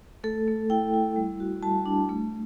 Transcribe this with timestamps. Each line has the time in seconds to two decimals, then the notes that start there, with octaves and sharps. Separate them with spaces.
0.24 A3 A4
0.48 A3
0.70 E4 G5
0.94 E4
1.16 G3
1.40 F#4
1.62 G3 A5
1.86 D4
2.09 A3